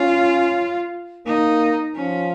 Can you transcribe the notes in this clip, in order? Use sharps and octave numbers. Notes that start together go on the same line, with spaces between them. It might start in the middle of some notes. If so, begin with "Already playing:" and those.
Already playing: C#4 F4
A#3 D#4
F3 C#4